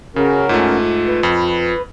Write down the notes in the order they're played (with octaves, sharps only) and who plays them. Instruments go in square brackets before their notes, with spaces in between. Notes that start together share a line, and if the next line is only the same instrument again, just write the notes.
[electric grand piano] C#3 [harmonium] C#4 F#4 A#4 [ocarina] G#4
[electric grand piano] G#2 A3 [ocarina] F4
[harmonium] B4
[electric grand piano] F2